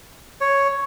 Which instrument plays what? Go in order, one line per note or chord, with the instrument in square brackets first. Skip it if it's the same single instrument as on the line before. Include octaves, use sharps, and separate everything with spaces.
[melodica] C#5